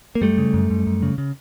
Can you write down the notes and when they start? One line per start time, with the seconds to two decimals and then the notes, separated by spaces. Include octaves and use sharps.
0.15 A#3
0.21 F#2 G3 A3
0.38 C#3
0.54 F#2
0.70 F#2
0.87 F#2
1.03 C#3
1.18 C#3